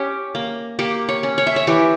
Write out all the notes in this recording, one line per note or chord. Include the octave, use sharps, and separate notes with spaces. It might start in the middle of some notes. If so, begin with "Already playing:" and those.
Already playing: C#4 G4
A#3
A#3 G4
C#5
C#4
C#5
E5
C#5
E3 G4